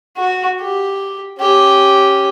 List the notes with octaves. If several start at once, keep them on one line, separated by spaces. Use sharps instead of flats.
F#4
G4
C#4 G4